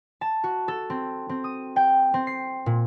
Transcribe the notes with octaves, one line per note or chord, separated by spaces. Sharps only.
A5
F#4
A4
C4
C4
D#6
G5
C4
C7
A#2